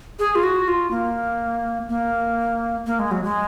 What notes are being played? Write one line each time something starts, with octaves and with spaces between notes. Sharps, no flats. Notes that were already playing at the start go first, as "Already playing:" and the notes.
G#4
F4
F#4
F4
A#3
A#3
A#3
G#3
F#3
G#3